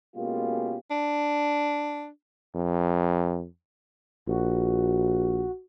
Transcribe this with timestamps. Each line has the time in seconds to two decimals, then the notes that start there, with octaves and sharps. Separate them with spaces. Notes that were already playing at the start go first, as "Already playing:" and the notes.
0.16 B2 G#3 A#3 C#4 F4 G4
0.91 D4
2.55 F2
4.28 A#1 F#4